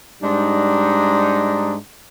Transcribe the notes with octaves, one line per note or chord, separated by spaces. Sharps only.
G#2 G3 D4 D#4